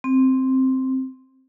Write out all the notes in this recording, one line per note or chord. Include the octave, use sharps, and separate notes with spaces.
C4